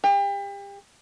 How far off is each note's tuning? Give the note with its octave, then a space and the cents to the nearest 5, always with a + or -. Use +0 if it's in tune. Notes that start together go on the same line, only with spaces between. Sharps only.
G4 +35